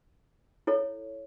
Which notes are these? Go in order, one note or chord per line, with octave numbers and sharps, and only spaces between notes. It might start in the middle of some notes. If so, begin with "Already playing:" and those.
E4 A4 C#5